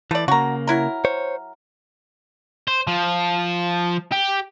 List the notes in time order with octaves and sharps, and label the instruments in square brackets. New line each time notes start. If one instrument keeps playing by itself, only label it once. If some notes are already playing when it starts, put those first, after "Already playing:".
[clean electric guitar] E3 [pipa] A3 D5
[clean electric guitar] C#3 A#3 [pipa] F#4 A#5
[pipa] F#3 E4 A#4
[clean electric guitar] C5 C#5
[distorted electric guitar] C5
F3
G4